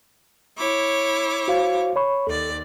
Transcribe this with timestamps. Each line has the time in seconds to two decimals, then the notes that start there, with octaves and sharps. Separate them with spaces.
0.57 E4 C#5 D6
1.48 F#4 C5 F5
1.96 C#5 B5 C#6
2.27 D#2 A4 D5